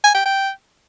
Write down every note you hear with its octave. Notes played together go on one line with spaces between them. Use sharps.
G#5
G5
G5